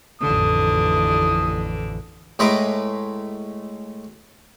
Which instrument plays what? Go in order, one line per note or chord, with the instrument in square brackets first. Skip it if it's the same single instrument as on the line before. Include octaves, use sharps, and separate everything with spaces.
[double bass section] A1 F2 E3 [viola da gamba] D3 [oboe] D#6
[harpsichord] A2 G#3 B4 D#5 A#5 D6